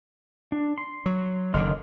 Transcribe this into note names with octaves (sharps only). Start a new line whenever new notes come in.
D4
C6
F#3
F#1 D3 D#3 D#5 C6 F6